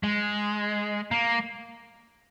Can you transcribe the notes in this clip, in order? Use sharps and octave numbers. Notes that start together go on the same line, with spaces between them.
G#3
A#3